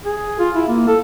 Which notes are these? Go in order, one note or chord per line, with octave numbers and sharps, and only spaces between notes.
G#4
F4
E4
A#3
A4